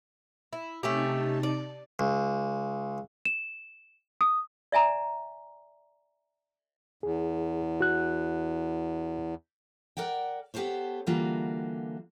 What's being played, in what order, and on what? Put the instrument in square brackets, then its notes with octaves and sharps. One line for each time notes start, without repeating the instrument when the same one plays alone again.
[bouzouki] E4
[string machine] C3 D#4 A5 [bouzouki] A3 C#4 G4
[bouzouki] D5
[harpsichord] C#2
[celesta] E7
D#6
[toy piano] D5 E5 G#5 A#5
[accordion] E2 [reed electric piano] G#4
[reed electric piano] F#4 F#6
[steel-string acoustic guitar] A#4 D5 F#5 G5
B3 G4 A4 C5 C#5
D3 E3 G3 A#3 F4 F#4